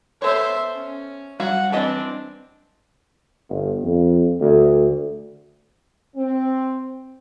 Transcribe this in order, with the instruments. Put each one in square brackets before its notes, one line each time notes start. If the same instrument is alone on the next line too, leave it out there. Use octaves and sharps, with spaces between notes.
[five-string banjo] B3 A4 C#5 [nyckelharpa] C5 E5
[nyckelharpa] C#4
[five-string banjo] F#3 F#4 [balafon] G3 [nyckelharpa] F#5
[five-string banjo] E3 B4 D#5 [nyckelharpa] C4 D4
[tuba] G1
F2
D2
[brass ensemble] C4